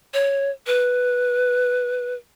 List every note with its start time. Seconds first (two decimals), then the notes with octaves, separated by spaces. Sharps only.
0.14 C#5
0.67 B4